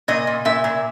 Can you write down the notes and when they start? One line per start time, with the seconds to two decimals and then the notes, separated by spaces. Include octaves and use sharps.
0.08 A#2 D#5
0.27 A#2
0.45 A#2 E5
0.64 A#2